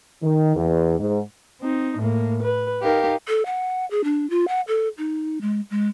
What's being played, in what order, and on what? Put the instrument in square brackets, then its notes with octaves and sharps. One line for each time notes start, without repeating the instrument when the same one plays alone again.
[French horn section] D#3
E2
G#2
[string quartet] C4 D#4
A2 A#3
B4
D#4 G4 A#4 F5
[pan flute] A4
F#5
G#4
D4
F4
F#5
A4
D#4
G#3
G#3